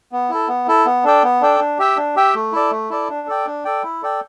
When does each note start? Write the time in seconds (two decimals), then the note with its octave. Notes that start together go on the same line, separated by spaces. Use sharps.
0.12 B3
0.30 E4 A4
0.48 B3
0.68 E4 A4
0.86 B3
1.04 D4 A4 D5 G5
1.24 B3
1.41 D4 A4 D5 G5
1.60 D4
1.79 G4 E5 G5
1.97 D4
2.16 G4 E5 G5
2.35 A3
2.52 E4 A4 D5
2.71 A3
2.90 E4 A4 D5
3.09 D4
3.27 A4 D5 G5
3.45 D4
3.65 A4 D5 G5
3.83 E4
4.02 A4 D5 G5